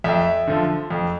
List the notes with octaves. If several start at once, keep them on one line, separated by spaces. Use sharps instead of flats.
F2 E5
D3 F3
F2